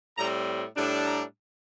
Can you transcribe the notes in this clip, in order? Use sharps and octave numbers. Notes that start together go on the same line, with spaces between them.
A2 G3 C4 A#5
A2 G3 D4
A#5